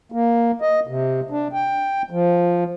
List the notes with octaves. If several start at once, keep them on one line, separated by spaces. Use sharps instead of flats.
A#3
D#5
C3
D4
G5
F3